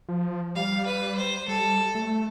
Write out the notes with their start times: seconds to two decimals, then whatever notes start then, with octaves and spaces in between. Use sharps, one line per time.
0.09 F3
0.55 G3 F5
0.86 B4
1.17 C5
1.48 G3 A4
1.95 A3